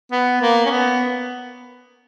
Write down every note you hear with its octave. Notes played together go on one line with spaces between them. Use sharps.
B3
A#3
C#4
B3